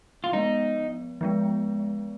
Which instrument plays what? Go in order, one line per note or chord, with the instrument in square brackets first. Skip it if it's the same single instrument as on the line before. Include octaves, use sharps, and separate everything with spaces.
[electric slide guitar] F4
[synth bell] F3 G#3 B3 [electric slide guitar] D#4
[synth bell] F3 G#3 B3